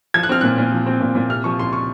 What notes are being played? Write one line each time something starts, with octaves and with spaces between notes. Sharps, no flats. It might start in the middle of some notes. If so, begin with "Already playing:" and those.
F3 G#6
F#6
C4 F6
A#2 F#6
A#2
F3
C4
A#2
A#2
C3 F6
F3 C#6
C#2 C6
C#6